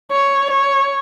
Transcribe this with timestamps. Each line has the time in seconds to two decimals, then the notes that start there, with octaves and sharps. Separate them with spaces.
0.12 C#5
0.51 C#5